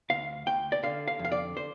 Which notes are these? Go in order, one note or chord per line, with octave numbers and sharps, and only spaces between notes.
D2 F5
D2 G5
D5
D3 F5
F5
F2
F5
D5
C5